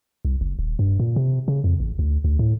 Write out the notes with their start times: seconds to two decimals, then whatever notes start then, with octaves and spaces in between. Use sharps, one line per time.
0.25 C2
0.41 F#1
0.59 D#1
0.79 G2
0.99 A#2
1.16 C3
1.48 C#3
1.64 F2
1.80 A1
1.99 D2
2.24 D2
2.39 A2